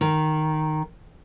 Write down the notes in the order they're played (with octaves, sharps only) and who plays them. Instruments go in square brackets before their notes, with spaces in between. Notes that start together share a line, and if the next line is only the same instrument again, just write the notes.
[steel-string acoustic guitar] D#3